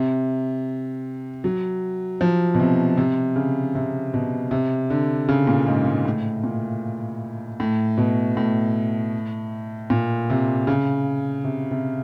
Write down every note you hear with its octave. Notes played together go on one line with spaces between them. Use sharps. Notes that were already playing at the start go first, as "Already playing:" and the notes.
Already playing: C3
F#3
F3
B2
C3
C3
C#3
C3
B2
C3
D3
C#3
A#2
G#2
G#2
A2
A#2
A2
B2
A2
A#2
C3
C#3
C3
C3